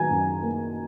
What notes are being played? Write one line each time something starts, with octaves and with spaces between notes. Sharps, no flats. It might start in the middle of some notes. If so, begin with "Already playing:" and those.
Already playing: D#3 F#3 G#5 A#5
F#2
A#3